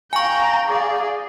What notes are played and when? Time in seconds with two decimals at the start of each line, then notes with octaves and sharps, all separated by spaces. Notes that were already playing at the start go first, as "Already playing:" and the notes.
0.13 F5 G5 G#5 A#5 C#6
0.69 G#4 D5